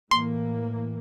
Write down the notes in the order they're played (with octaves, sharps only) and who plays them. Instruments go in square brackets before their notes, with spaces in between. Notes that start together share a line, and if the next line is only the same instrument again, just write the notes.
[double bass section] A2 E3 A#3 [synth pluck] C6